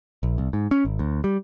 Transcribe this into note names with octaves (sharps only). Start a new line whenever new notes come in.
A#1
C2
G#2
C#4
G#1
D2
G3